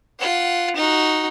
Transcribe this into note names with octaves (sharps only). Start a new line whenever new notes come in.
F4 F#5
D#4 F#4